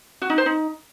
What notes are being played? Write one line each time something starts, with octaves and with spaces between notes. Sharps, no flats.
F#4
D#4
C5
D#4